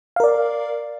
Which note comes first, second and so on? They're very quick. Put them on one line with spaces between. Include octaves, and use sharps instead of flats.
F5 A#4 D5